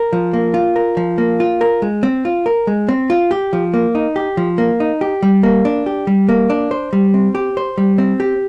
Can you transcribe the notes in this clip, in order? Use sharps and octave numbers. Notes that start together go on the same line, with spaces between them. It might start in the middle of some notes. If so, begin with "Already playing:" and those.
Already playing: A#4
F3
A#3
F4
A#4
F3
A#3
F4
A#4
G#3
C4
F4
A#4
G#3
C4
F4
G4
F3
A#3
D#4
G4
F3
A#3
D#4
G4
G3
A#3
D4
G4
G3
A#3
D4
C5
G3
C4
G4
C5
G3
C4
G4